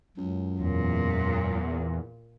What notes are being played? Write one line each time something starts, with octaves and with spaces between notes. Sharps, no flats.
C#2 F#2
E2 A#2